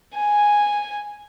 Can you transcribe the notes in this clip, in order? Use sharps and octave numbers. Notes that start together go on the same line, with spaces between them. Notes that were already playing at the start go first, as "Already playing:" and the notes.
G#5